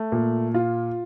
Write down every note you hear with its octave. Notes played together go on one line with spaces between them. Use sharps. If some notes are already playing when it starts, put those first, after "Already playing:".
Already playing: A3
A#2
F4